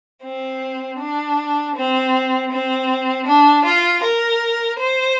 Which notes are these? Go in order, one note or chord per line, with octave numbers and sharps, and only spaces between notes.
C4
D4
C4
C4
D4
F4
A#4
C5